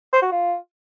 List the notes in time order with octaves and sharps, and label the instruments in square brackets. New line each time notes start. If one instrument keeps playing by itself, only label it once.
[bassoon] C5
F#4
F4